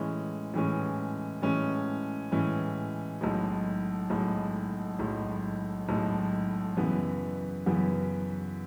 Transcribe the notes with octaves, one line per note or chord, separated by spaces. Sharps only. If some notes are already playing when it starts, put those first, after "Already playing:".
Already playing: A2 E3 G#3 C#4
A2 E3 G#3 C#4
A2 E3 G#3 C#4
A2 E3 G#3 C#4
B1 A2 G#3
B1 A2 G#3
B1 A2 G#3
B1 A2 G#3
F#2 C#3 E3 B3
F#2 C#3 E3 B3